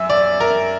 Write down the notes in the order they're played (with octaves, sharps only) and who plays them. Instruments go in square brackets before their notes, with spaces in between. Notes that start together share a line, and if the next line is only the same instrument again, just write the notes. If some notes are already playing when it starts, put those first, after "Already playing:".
Already playing: [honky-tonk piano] F#2 E5
D5
A#4